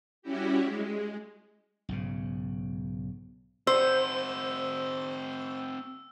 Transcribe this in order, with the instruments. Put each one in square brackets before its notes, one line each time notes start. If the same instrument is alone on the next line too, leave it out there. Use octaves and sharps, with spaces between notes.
[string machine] G3 C#4 E4 F#4 G4
G#3
[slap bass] B1 G#2 C#3
[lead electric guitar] C4 F#4 [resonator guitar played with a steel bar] C5 [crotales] E6